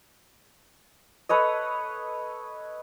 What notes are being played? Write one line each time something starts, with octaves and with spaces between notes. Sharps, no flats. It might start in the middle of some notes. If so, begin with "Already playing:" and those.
A4 B4 C#5 D#5